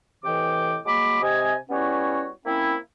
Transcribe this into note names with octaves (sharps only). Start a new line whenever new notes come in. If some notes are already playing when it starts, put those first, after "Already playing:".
A2 C3 E3 D#5 G5 D6
F#3 G#3 A#3 B5 D6
C3 D#5 G#5
G3 B3 C#4 E4 F#4 C#5
A#3 C4 C#4 E4